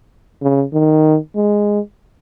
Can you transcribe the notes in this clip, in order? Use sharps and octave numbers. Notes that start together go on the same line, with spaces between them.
C#3
D#3
G#3